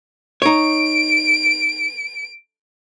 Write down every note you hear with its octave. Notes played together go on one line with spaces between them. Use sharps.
D#4 C#5 D7